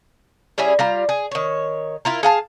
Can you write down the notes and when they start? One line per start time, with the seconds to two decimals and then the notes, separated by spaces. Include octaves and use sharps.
0.58 G3 C#4 E4 G#4
0.79 G3 F4 A#5
1.09 G#4
1.31 D#3 C#5
2.05 E4 F4 A#4
2.23 G#4 F5 A5